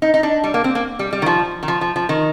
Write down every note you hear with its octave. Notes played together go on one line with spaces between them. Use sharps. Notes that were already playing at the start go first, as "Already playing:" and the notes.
D#4
D#4
D4
G3
A#3
C4
A#3
G3
G3
D#3
F3
D#3
F3
F3
F3
D#3